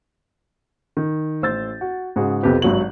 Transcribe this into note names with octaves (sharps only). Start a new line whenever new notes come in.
D#3
A1 C5 E6 G6 A6
F#4
G#2 C#3 F#4 G#4
B1 F2 C3 G4 B4
G#1 G2 F#3 F#4 F#7